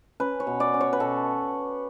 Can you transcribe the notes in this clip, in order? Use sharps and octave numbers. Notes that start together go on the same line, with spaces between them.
C#4 B4
C#5
B2
D5
C#4
C#5
B4
B2 A4